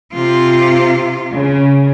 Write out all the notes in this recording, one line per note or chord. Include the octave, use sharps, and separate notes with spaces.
C3 F4
C#3